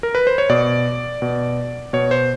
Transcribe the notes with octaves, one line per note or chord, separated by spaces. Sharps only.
A#4
B4
C5
C#5
B2 D5
B2
B2 C#5
C5